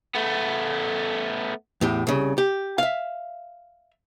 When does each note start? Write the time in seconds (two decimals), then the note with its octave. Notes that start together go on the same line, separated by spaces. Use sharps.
0.15 A3 B3
1.81 E2 A2 G4
2.07 C2 C#3
2.38 G4
2.78 E5 F5